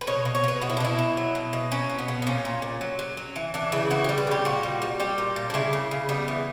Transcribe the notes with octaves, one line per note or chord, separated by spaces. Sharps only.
B4
B2 C#5
B2
C#5
B2 B4
B2 F#4
E4
D4
B2 E4
B2
F#3
B2
B2
F#3 C#4
B2
B3
B2
B3
A#2 C#4
A#2
A#2
F#3
F#3
F#3
E3
E3 D4
C#3 E4
E3 F#4
G3 G4
B4
C#3 G4
A#2 F#4
G3
G3
G3 G4
A#2
A#2
D4
C#3 E4
C#3
C#3
G3 B3
E3